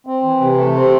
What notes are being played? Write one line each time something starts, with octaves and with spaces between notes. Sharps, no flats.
C4
E3
C3
A3
C4